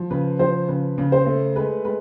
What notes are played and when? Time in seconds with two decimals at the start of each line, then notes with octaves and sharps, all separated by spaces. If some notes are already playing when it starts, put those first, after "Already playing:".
Already playing: F3
0.11 C#3 B4
0.39 F3 C5
0.68 C#3 B4
0.98 C#3
1.12 C5
1.26 A3
1.55 G#3 B4
1.85 G#3 B4